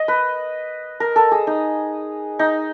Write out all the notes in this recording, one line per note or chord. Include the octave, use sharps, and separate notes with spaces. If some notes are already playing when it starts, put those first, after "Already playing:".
Already playing: D#5
B4
A#4
A4
G#4
D#4
D#4